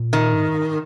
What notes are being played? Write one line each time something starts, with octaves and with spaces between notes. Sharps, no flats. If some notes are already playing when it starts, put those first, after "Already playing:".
Already playing: A#2
D#3
G#2